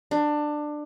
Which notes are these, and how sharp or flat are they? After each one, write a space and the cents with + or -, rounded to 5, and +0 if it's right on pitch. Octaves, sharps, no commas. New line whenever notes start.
D4 +20